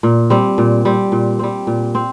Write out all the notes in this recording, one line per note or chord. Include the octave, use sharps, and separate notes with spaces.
A#2
G3 C4
A#2
G3 C4
A#2
G3 C4
A#2
C4